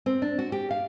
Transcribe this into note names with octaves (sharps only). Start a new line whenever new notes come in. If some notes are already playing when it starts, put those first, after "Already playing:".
C4
D4
F#4
G4
F5